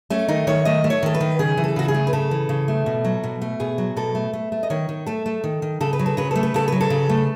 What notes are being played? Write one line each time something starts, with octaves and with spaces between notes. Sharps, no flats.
A3 C#4
D#3 D#4
D#3 C#5
A3 D#5
A3
C#5
D#3 A4
B4
D#3
C#3 G#4
E3
A4
C#3 F#4
G#4
A3
B4
C#3 A4
E3
C#3
A3
B2
F#3
B2
A3
B2 G#4
F#3
B2 A4
A3
A3
A3
D#5
D#3 C#5
D#3
A3 A4
A3
D#3
D#3
C#3 A4
B4
F#3
A4
C#3 B4
A3 A4
B4
C#3 A4
F#3 B4
A4
C#3
A3